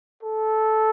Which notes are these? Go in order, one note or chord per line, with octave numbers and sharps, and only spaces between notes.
A4